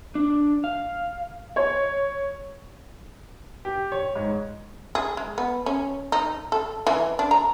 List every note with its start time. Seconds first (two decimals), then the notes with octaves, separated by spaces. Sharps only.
0.15 D4
0.64 F5
1.56 C#5
3.65 G4
3.92 C#5
4.16 G#2
4.95 G#4
5.17 G#3
5.38 B3
5.66 C#4
6.12 D#4
6.52 A4
6.87 E3
7.19 D4
7.31 A#5